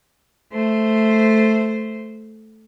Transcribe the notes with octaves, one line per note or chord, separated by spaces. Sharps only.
A3 C5